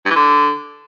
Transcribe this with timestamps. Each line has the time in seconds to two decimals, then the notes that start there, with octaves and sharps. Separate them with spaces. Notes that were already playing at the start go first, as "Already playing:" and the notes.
0.05 G2
0.10 E3
0.15 D3